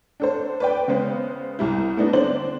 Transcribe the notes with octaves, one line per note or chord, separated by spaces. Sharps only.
D4 A4 C5
B4 D5 G5
C#3 G#3 B3 C5
C2 G3 E4
A3 B3 D4 D#4
D3 C4 D4 C5 D5 F#7